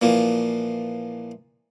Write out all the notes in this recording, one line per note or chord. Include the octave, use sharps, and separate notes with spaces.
A#2 E3 F3 A#3